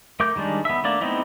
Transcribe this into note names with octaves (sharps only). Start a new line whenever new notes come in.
A3 A#4 D6 G6
D#3 G3 G#3 D4
B3 E5
A3 A#3 D4 D5
A3 B3 C4 D#4 E4